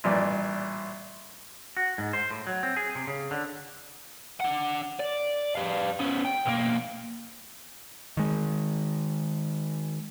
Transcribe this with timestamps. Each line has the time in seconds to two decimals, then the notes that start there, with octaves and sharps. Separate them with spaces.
0.04 A1 G2 A#2 D5
1.77 F#4
1.98 G#2
2.13 C5
2.30 A2
2.47 F#3
2.63 C4
2.77 G#4
2.95 C3
3.07 C#3
3.31 D3
4.40 D4 F#5
4.99 D5
5.55 G3 F5
5.99 B3 C#4
6.25 G5
6.46 B1 A#3
8.17 D#3 G#3